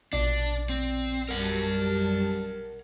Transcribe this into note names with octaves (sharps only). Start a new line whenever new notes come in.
A#1 B2 D4 D5
C4
F#2 G3 A#4 F#5 A5